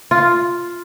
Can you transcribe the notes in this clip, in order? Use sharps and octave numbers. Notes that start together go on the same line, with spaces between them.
F4